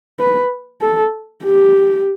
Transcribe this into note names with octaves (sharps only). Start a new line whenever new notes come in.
B4
A4
G4